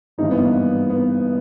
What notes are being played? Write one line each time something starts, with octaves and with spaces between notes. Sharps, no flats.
G#1 G2 E3 D#4
B3
A#3
B3